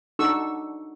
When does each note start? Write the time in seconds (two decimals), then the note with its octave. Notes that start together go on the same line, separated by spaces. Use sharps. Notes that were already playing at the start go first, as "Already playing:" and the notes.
0.19 D4 D#4 F#4 A4 C#6 E6